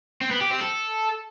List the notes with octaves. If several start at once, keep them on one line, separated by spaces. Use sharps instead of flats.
C4
B3
G4
C4
A4